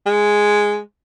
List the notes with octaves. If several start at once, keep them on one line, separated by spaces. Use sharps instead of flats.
G#3